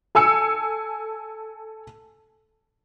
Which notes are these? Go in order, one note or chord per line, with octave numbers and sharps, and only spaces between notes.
A4 G#5 E6 C#7